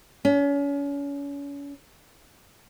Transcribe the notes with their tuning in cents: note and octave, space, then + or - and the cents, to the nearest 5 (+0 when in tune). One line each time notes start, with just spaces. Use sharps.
C#4 +35